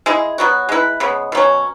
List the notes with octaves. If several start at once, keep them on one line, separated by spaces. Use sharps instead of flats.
G#3 E4 G#4
F#3 B3 F#4
G#3 E4 B4
C#3 G#3 B3
B2 F#3 C#4